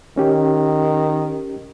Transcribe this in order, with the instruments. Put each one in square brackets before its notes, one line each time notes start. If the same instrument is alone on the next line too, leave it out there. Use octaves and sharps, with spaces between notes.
[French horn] D#3 [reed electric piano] C#4 G4